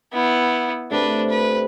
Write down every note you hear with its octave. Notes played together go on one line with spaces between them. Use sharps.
B3 E4
C3 A3 D4 B4
B4